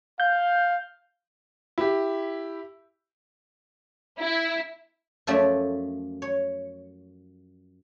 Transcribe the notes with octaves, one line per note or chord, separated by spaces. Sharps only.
F5 G6
E4 G4
E4
F#2 F3 A3 C#4 D5 E5
C#5